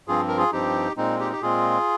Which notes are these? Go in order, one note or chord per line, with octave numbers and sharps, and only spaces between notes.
G2 F3 C4 F4 G#4
A#4
F4 G#4
G2 F3 C4 D#4 G4
A#2 G#3 C4 D#4
D#4 G4
G4
A#2 G#3 C4 F4 G#4